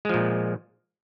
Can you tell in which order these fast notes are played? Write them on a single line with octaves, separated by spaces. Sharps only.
G#3 F3 A#2